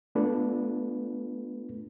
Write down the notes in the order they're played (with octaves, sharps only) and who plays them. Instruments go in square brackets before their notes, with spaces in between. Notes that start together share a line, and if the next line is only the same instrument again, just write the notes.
[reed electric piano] A3 B3 D4 F4 A4 B4